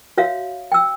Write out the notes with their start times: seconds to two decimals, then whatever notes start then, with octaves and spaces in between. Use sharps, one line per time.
0.17 F#4 C#5 E5 F5
0.72 G5 E6